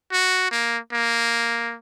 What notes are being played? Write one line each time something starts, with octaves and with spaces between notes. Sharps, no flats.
F#4
A#3
A#3